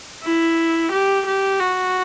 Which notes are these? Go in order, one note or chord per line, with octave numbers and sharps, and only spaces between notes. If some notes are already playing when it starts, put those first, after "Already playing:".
E4
G4
G4
F#4